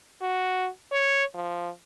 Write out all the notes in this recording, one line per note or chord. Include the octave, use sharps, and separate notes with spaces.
F#4
C#5
F3